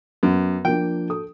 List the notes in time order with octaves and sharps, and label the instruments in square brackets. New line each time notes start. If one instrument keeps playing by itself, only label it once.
[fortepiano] F#2 [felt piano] B3
[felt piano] F3 A#3 D4 [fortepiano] G5
[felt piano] A4 D#6